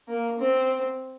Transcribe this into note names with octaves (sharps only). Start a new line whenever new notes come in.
A#3
C4